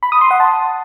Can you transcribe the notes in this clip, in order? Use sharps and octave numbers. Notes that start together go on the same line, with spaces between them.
B5
D#6
C6
F#5
A5